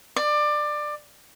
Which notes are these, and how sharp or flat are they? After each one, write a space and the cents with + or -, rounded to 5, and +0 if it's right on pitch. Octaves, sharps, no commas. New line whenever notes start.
D5 +20